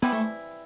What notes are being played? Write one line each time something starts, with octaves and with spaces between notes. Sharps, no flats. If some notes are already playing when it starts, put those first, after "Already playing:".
E3 G3 B3 C4 E4
A3